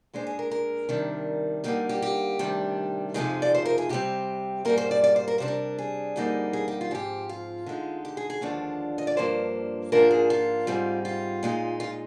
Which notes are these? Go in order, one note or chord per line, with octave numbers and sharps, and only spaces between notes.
A#2 G#3 D4 C5
G#4
A#4
A#4
C3 D#3 G3 D4
D3 G3 A#3 D#4 G4
G4
G4
D2 C3 D#3 G3 D4
F2 C3 F3 G#3 D#4 G#4
D5
C5
A#4
G#4
C3 G3 C4 G4
G#2 G3 A#3 A#4
C5
D5
D5
C5
A#4
C3 G3 D4 C5
A#4
G#4
F2 D3 G3 A#3 D#4
G#4
G4
F4
G#2 F3 C4 G4
F4
D3 G#3 D#4
G4
G#4
G#4
D#2 D3 F3 G#3 D4
D#5
D5
G2 F3 A#3 D4 C5
G#2 F3 A#3 D4 A#4
G#4
F4
G#2 G3 C4 D#4
F4
A#2 G#3 D#4
F4